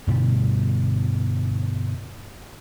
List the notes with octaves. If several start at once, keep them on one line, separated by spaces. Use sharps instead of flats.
G2 B2 D3 G3